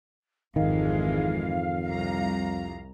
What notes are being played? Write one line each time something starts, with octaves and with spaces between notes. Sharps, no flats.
G#1 F2 D#3 E3 G#3 F5
C2 A#5